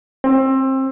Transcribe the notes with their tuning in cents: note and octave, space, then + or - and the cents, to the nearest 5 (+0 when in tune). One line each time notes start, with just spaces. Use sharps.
C4 +25